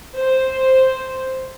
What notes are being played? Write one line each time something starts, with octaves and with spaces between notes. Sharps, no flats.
C5